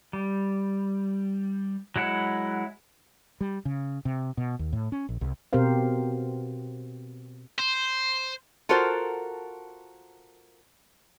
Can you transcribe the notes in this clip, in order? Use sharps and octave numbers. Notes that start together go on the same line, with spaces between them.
G3
F#3 G#3 E4 F#5
G3
C#3
C3
B2
D#2
A2
C#4
A#1
C2
B2 C4 G4 A#4 C5 F5
C5
F4 F#4 A4 A#4 C5